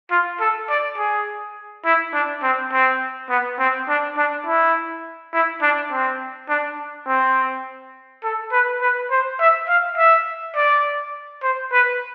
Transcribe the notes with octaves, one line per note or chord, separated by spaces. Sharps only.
F4
A4
D5
G#4
E4
D4
C4
C4
B3
C4
D4
D4
E4
E4
D4
C4
D4
C4
A4
B4
B4
C5
E5
F5
E5
D5
C5
B4